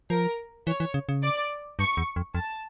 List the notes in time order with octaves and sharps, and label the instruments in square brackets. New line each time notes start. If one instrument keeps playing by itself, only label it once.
[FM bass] F3 [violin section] A#4
[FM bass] E3 [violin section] C#5
[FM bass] E3
C#3
C#3
[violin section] D5
[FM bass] G2 [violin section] C#6
[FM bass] E2
F2
[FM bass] F2 [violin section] A5